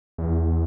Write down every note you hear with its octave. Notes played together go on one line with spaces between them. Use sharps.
E2